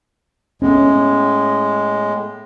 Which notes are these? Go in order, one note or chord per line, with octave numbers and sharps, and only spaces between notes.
A2 G#3 B3 C#4